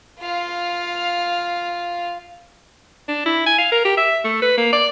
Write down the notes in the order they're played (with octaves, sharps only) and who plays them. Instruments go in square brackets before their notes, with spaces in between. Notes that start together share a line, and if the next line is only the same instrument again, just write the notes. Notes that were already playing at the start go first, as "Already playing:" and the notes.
[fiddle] F4 F5
[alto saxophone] D4
E4
G#5
F5
A#4
G4
E5
A3
B4
A#3
D5